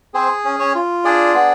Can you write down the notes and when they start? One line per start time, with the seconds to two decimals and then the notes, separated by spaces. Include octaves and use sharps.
0.14 C4 G#4 C5
0.45 C#4
0.59 C#4 C#5
0.75 F4
1.05 D4 G#4 D5
1.34 B3